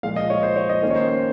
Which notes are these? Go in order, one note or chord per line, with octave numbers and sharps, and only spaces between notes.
A#2 F3 G#3 F5
D#5
C#5
C5
C#5
D#5
D#3 A#3 C#4
C#5
C5
C5